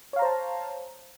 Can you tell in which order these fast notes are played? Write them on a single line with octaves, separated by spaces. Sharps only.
C#5 F5 A#5 C5 A5